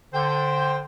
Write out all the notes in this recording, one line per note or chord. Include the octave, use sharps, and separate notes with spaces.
D3 C5 G5